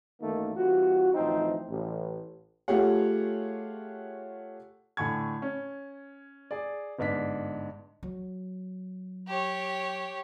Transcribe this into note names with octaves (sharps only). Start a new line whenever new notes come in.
F#2 D#3 E3 A3 A#3 D#4
E3 G3 C4 F4 F#4
D2 A2 E3 F3 C4 D#4
A1
A3 F4 G4 G#4 C#5 F#5
A2 D3 G#5 C#6 G#6
C#4
G#4 D5
G1 G#2 D4 B6
F#3
G4 C#5